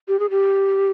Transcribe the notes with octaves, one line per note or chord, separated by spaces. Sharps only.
G4
G#4
G4